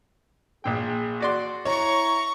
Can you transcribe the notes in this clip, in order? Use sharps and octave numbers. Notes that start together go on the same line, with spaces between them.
A#1 A#2 G#4 G5
F#4 D5 C6
E4 C#5 A#5 C#6